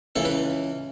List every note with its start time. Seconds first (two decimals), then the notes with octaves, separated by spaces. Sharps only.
0.16 C#2 C#3 E3 A4
0.25 B4